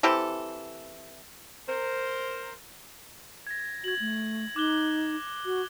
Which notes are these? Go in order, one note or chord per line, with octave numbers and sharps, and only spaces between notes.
E3 C4 G4 A4
A#4 C5
G#6 A#6
F#4 G#6 F#7
A3
D#4 D6 F#6 G7
F#4